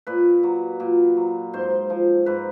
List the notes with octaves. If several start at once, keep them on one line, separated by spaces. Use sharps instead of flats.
A#2 B4
F#3
A#2
F#3
G#2 C5
F3
G#2 B4